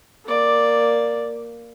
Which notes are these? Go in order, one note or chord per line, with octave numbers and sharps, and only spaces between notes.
A#3 D5